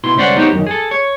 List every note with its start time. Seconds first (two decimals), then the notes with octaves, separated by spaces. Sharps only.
0.04 B2 E4 C6
0.16 C#2 G2 C#4 C5 D5 F#5
0.36 B3 D#4 F#4 G4 C5 C#5
0.53 F#2 D#3
0.67 G#4 A4
0.91 C#5